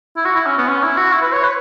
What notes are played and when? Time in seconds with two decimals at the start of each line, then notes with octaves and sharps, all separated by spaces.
0.17 E4
0.25 F#4
0.36 E4
0.47 C#4
0.58 B3
0.68 C#4
0.83 E4
0.97 F#4
1.12 E4
1.22 B4
1.33 C#5
1.44 B4